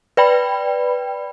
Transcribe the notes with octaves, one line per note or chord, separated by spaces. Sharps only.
B4 D5 G5 B5